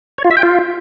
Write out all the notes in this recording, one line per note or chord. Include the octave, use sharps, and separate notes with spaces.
C#5
F4
E5
G5
F4